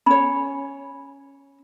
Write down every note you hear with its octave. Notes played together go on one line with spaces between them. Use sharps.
C#4 C#5 B5